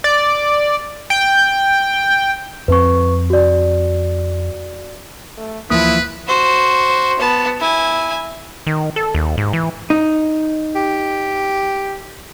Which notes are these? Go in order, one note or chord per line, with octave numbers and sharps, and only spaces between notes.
D5
G5
F2 C4 B4 C#6
F#4 D5
A3
D2 E3 F3 A#3 E4 B4 D#6
F#4 C5
B3 A5
E4 G#5
D#3
A4
D#2
G#2
E3
D#4
G4